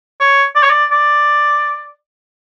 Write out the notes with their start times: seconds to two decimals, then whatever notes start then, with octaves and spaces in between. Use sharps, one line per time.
0.20 C#5
0.55 D5
0.63 C#5
0.70 D5
0.91 D5